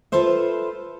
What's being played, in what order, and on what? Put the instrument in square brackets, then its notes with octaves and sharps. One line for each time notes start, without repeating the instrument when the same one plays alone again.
[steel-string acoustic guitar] F4 A4 B4 C5 E5